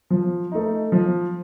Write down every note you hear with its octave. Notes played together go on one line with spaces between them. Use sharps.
F3
A3 D#4
F3